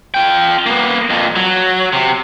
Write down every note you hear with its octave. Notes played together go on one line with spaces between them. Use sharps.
F4 G5
A#3 B3
F2 A#2
F#3
C3